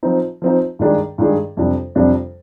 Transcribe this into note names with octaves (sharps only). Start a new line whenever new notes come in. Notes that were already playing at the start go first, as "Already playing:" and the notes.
F3 C4 D#4
F3 C4 D#4
G2 D#3 G#3 D4 G#4
G2 D#3 G#3 D4 G#4
F2 C3 G3 D4
F2 C3 G3 D4